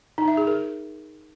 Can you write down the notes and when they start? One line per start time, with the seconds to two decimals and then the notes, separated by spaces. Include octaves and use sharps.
0.18 D#4
0.28 E5
0.37 G#4
0.47 A#4